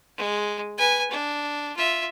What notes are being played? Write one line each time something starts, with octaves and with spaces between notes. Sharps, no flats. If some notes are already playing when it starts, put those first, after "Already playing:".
G#3
B4 G#5
D4
F4 E5